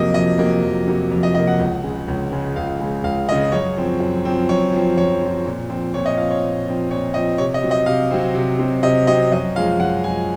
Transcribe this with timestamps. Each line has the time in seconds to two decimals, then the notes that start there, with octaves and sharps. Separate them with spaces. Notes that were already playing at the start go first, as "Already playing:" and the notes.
Already playing: F2 C3 F#3 A#3 D#5
0.14 F2 D#5
0.38 C3 F#3 A#3
0.63 F2
0.87 C3 F#3 A#3
1.11 F2
1.23 D#5
1.34 C3 F#3 A#3 D#5
1.47 F#5
1.59 C#2
1.84 C#3 G#3
2.08 C#2
2.32 C#3 G#3
2.56 C#2 F5
2.80 C#3 G#3
3.03 C#2 F5
3.29 C#3 G#3 D#5
3.52 F#2 C#5
3.77 F3 C4
4.00 F#2
4.25 F3 C4
4.49 F#2 C#5
4.73 F3 C4
4.97 F#2 C#5
5.21 F3 C4
5.46 A#2
5.70 F3 C4
5.94 A#2 C#5
6.06 D#5
6.17 F3 C4 F5
6.31 C#5
6.42 A#2
6.66 F3 C4
6.90 A#2 C#5
7.14 F3 C4 D#5
7.38 C3 C#5
7.54 D#5
7.62 F#3 C4
7.71 D#5
7.86 C3 F5
8.11 F#3 C4
8.35 C3
8.59 F#3 C4
8.83 C3 D#5
9.07 F#3 C4 D#5
9.32 F#2 D#5
9.56 F3 G#3 F5
9.80 F#2 F#5
10.04 F3 G#3 G#5